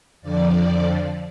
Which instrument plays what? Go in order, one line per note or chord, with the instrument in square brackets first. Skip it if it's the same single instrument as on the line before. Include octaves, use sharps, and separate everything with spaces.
[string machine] F2 D3 F3 D5